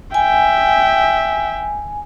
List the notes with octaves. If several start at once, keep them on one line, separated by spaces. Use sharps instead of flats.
E5 G5 G#5